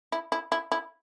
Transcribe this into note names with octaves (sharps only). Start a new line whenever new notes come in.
E4
E4
E4
E4